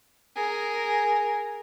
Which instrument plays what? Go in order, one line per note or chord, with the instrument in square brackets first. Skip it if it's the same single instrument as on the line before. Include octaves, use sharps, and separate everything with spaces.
[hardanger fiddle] G#4 A#4